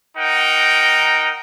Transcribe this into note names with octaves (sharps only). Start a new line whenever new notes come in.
D#4 A#4 F#5 G5 A#5